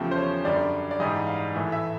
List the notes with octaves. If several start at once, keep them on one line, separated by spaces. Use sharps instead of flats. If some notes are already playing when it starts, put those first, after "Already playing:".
Already playing: E2 C#3 F3 A3 G4
C5
C#5
F#2 D3 G3 D5
D5
G#2 E3 G3 D#5
F5
A2 E3 A3
E5